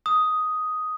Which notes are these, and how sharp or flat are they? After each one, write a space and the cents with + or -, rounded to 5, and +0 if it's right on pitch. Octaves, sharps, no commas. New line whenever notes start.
D#6 +5